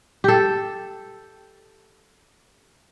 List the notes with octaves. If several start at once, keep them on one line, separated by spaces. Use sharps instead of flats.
G4 A4